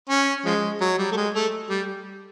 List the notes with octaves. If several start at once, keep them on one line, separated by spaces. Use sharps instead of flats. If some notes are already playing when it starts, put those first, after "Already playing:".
C#4
F3 G#3
F#3
G3
A3
G#3
A3
G3